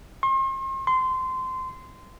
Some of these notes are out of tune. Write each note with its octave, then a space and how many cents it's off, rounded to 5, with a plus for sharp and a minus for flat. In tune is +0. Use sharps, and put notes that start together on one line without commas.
C6 +40
C6 -20